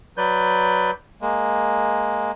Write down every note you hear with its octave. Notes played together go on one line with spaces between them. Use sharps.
F#3 B4 D5 G6
G#3 A#3